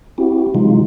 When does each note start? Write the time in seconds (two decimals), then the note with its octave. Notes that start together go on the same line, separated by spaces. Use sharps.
0.18 C4 E4 F#4 G4
0.55 C3 E3 F#3 G#3 D#4 F4